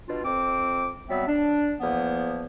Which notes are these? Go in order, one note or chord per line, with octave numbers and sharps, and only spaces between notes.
B2 D4 F4
F2 C4 D6
F#3 G3 B3 C4 E5
D4
E2 F3 A#3 B3